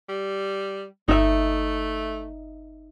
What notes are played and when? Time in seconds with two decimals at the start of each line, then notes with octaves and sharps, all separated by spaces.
0.09 G3
1.08 G1 A3 D#4 E5